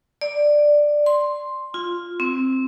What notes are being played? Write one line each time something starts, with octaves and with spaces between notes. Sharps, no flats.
D5
C6
F4
C4